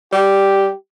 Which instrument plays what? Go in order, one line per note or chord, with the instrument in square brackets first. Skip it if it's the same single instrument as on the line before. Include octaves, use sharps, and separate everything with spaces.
[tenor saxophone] G3 [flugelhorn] G4